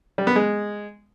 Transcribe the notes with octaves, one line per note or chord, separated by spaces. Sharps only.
G3
B3
G#3